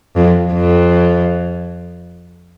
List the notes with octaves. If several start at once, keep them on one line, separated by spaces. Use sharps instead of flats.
F2
F2